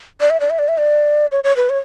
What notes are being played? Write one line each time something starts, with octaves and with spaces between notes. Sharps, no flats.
D5
E5
D5
E5
D5
E5
D5
C#5
C#5
B4
C#5